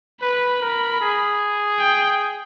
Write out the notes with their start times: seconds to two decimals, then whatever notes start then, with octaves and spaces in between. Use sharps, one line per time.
0.22 B4 B5
0.62 A#4
1.01 G#4
1.79 G5